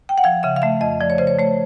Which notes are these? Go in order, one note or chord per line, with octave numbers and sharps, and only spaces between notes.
G5
F#5
F3 F5
C#3 E5
F5
A3 E5
F2 D#5
F3 D5
C#5
C#3 C5
C#5
A3 C#5